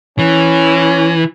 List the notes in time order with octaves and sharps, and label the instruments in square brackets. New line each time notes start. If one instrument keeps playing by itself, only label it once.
[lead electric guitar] E3 [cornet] C#4